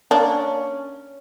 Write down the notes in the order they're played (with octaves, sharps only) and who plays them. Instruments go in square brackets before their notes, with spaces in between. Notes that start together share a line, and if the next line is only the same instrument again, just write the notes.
[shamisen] A#3 D4 [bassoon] C#4